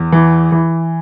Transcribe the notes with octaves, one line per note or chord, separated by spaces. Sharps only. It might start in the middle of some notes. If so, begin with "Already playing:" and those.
Already playing: E2
E3
E3